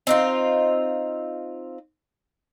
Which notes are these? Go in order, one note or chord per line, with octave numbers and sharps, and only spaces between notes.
C4 D#4 F4